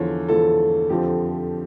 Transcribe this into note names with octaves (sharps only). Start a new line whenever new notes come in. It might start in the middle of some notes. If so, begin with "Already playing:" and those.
Already playing: E2 D3 F3 C#5
E2 D3 F3 A4
F2 D3 F3 G4